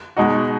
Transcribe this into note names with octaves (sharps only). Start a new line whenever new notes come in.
B2 G#3 D#4 F#4